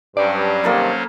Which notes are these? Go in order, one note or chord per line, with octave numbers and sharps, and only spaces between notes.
G2 F#3 C#4 C5 D5
C3 D#3 G3 A#3 A4 B5